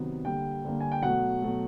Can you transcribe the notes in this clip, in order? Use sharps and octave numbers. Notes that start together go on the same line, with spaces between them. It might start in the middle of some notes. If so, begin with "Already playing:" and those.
Already playing: C3 D#3 F#3 B3
D3 G3 A#3 G5
D3 G3 A#3
G#5
G5
B2 F#3 A3 F#5
B2 F#3 A3